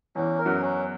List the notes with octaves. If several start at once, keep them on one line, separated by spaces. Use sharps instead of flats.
E2 E3 C#4
A#4
F#2 F#3
C#4